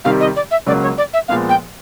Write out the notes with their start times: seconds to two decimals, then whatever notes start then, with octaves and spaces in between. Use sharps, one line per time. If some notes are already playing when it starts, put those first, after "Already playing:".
0.04 C3 D#3 G3 F5
0.20 D#5
0.36 D5
0.51 E5
0.66 C#2 C#3 F#3 A#3 D5
0.82 C#5
0.98 D5
1.13 E5
1.28 A#2 F3 G#3 B3 F5
1.49 G5